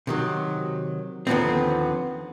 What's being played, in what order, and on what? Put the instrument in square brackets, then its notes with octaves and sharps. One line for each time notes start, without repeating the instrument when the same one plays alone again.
[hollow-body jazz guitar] C3 D#3 F#3
D#2 D3 D#3 F3 B3 C4